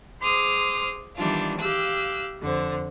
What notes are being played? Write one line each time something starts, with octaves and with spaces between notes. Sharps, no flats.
G#4 C5 C6 D6 D#6 F6
D#3 E3 G3 B3 D4 F4
G4 F5 E6 F#6
F2 D3 C5